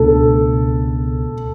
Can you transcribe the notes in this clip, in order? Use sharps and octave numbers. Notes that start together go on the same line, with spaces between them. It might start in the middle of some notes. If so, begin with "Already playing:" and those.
Already playing: C#2 B2 A3 D4 A4